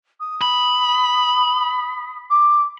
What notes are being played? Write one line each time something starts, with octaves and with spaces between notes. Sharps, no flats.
D#6
B5
D6